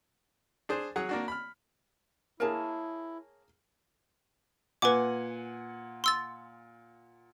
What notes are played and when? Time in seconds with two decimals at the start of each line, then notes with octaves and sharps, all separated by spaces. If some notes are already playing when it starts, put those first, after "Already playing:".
0.69 D4 G#4 C5
0.96 F#3 G#4 F#5
1.09 A#3 D4 F#4
1.28 B5 F6
2.40 A#3 E4 G#4 A#4 C#5 A5
4.82 A#2 B4 F#5 G#5 D6
6.04 C6 E6 A6